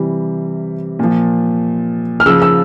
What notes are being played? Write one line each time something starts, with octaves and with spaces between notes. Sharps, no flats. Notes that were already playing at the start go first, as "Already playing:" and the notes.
Already playing: C3 E3 G3
A#2 F3
F6
C#3 F3 E6
E6